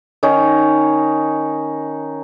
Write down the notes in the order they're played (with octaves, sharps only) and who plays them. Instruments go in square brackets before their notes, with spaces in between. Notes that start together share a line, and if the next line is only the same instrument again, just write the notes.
[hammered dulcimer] D#3 C#4 D#4